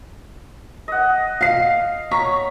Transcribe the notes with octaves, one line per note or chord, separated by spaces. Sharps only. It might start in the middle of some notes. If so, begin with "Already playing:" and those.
D#5 F#5
F5 C7
C#5 A#5 C#6 B6